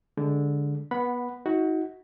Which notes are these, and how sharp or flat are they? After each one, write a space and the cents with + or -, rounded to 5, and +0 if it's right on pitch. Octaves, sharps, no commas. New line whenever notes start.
D3 -15 G#3 +0
B3 -20 F#5 +0 B5 +0
D#4 +40 F#4 +0